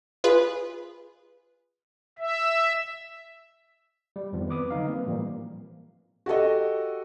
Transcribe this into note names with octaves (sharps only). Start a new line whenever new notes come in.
F4 G#4 B4
E5
G3
F2 D#3 F3 B3
C4 B4 D6 D#6
D3 F#3 D#4 F5
G3 A#3 C4 B4
A2 E3 F3 G3 A#3
F#4 G4 A4 D#5